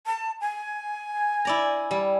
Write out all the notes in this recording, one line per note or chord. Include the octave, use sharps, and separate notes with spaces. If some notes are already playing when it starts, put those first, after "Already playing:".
A5
G#5
E4 D5 A#5
G3